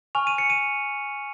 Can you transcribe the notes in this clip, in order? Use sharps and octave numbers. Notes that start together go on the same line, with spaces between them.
G#5 C#6 F6 F7
D#7
C#7
D#7